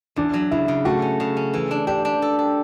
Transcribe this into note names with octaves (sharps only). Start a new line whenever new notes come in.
E2 D4
F#3
C#3 E4
C#3
A3 F#4
C#4
C#3
C#4
E3
D4
D4 G4
D4
A4
A4